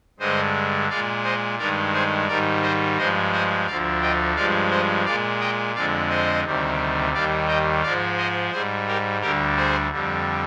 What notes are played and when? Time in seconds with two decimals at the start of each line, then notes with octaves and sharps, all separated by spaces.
0.19 G2 D3 G#3 C5 D#5
0.89 A#2 G#3 D5 F5
1.23 C5 D#5
1.58 G2 D#3 G#3 A#4 D5
1.93 G#4 C5
2.27 G#2 D#3 G3 A#4 D5
2.62 C5 D#5
2.97 G2 F3 G#3 C5 D#5
3.32 C5 D#5
3.66 D2 D3 F3 D5 F5
4.01 D#5 G5
4.36 G2 F3 G#3 D5 F5
4.71 C5 D#5
5.05 A#2 G#3 D5 F5
5.40 D#5 G5
5.74 F2 D3 G#3 D5 F5
6.09 C5 D#5
6.44 D2 C3 D#3 G3
7.13 D#2 D#3 G3 D5 F5
7.48 D#5 G5
7.82 G#2 F3 G#3 D5 F5
8.17 C5 D#5
8.52 G#2 G3 G#4 C5
8.87 G4 A#4
9.21 D2 D3 G3 G4 A#4
9.56 G#4 C5
9.91 F2 D3 G3